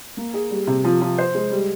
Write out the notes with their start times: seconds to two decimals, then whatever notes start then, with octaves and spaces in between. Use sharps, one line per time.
0.17 A#3
0.34 G#4
0.51 G3
0.67 C3
0.84 F3
1.01 F3
1.18 C5
1.35 G#3
1.51 G3